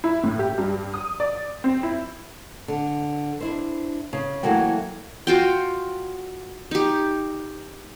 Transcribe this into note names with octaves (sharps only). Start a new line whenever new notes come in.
E4
A2
G4
G2
D#6
D5
C4
E4
D3
D4 E4 C5
C#3
E3 F#3 A3 A#3 F#4 G5
F4 F#4 G5
D#4 G4